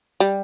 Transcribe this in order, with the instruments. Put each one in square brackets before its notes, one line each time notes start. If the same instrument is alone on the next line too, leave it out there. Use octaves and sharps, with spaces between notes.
[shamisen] G3